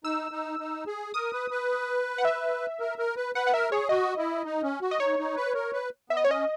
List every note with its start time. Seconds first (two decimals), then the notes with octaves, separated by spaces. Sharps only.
0.04 D#4 E6
0.31 D#4
0.59 D#4
0.87 G#4
1.14 A#4 D#6
1.33 B4
1.51 B4
2.18 F#5
2.25 E5
2.80 A#4
2.98 A#4
3.17 B4
3.35 B4 F#5
3.47 F#5
3.53 A#4 E5
3.72 G#4 C#5
3.89 F#4 D#5
4.18 E4
4.45 D#4
4.63 C#4
4.81 F#4
4.91 D#5
5.00 D#4 C#5
5.19 D#4
5.36 B4
5.55 A#4
5.73 B4
6.10 B3 E5
6.17 D#5
6.25 C#5
6.28 C#4 D#5